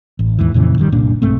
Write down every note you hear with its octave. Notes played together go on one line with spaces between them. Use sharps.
A1
D#2 G#2 D#3 E3
F2 A#2 C#3 E3
G1 D#3 G3
F#1 C2 A#2 D4
B1 G#2 A3 C4